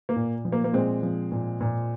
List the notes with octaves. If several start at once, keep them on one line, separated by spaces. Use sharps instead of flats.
A#3
A#2
F3
A#3
A#3
A#2 G#3 C4
F3
A#2
A#2